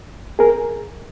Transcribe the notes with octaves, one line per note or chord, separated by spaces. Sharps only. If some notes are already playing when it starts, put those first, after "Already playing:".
G#4 A#4